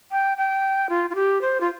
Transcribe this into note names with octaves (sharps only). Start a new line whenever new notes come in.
G5
G5
F4
F4
G4
C5
F4